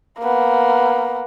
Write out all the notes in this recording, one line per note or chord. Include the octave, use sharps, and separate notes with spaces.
A#3 B3